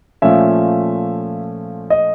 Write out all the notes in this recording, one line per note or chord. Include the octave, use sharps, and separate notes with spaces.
A#2 F3 A3 C#4 E5
D#5